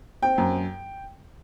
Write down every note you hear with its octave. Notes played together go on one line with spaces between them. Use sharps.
C4 G5
F#2